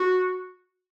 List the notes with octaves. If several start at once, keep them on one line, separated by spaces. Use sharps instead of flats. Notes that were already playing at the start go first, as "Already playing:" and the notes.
Already playing: F#4